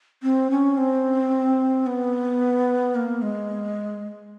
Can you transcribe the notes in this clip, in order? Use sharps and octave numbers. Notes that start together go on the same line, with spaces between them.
C4
C#4
C4
B3
A#3
G#3